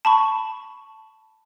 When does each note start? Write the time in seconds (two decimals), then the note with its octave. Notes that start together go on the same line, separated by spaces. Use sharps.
0.05 A5 B5 C#6